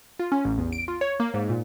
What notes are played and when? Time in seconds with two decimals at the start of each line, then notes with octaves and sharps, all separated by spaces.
0.19 F4
0.32 C#4
0.45 A1
0.58 E2
0.72 D7
0.88 F4
1.01 C#5
1.20 A#3
1.34 G#2
1.49 A#2